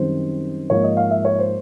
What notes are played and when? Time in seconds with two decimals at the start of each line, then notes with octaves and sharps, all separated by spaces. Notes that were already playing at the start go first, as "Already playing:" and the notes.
Already playing: F#2 D#3 G3 C4 C5
0.70 G#2 F3 A#3 C#5
0.84 D#5
0.97 F5
1.11 E5
1.25 C#5
1.39 C5